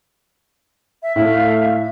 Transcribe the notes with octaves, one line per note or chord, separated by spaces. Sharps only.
E5
A2 A3 E5 F5